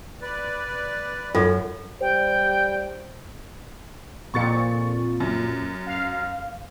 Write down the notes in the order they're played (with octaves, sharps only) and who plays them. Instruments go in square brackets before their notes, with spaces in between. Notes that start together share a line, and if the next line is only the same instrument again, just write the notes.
[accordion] B4 D5
[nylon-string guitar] F#2 [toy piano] F4 A4
[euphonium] G3 [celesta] C5 [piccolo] G5
[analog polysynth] F2 A#2 [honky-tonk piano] C#6 A6 C#7
[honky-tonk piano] F#2
[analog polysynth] F5